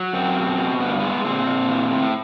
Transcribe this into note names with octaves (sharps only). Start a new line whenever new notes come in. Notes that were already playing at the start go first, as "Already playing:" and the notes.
Already playing: F#3
F#2 C4
B2
B2
G2 B3
A#3
G#3 B3
A#2 C4
A#2
E3
A2